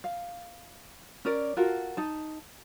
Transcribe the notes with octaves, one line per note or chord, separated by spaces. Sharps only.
F5
C#4 A#4 D5
F4 F#4 A4 A#4
D#4 A5